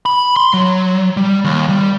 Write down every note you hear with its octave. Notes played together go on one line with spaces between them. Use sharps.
B5
C6
F#3
G3
D#2
G3